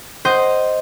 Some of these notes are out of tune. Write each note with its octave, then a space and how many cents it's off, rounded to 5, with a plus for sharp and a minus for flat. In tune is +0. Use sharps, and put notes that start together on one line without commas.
C5 +0 D#5 +0 F#5 +30